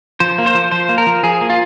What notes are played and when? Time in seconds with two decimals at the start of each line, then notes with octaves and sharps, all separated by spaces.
0.20 F3 C5
0.38 A#3
0.46 C5
0.55 F3
0.72 F3 C5
0.89 A#3
0.98 A#4
1.07 F3
1.23 F3 G#4
1.41 A#3
1.50 F4